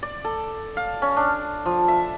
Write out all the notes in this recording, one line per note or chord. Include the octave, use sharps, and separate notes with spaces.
D5
A4
F5
C#4
D4
F3
E5